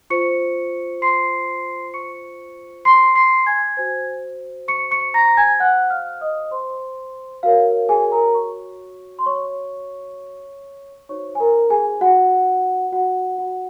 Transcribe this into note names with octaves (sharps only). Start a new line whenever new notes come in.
F4 C5 C#6 C#7
C6 C7
C#6 C#7
C6 C7
C6 C7
G#5 G#6
F#4 C5 G#5 G#6
C#6 C#7
C#6 C#7
A#5 A#6
G#5 G#6
F#5 F#6
F5 F6
D#5 D#6
C5 C6
F#4 A#4 C#5 F5
G#4 G#5
A#4 A#5
C#5 C#6
C6
C#5 C#6
D#4 F#4 C5 C#5 C#6
G#5
A#4 A#5
G#4 G#5
F#4 F#5
F#4 F#5
F#4 F#5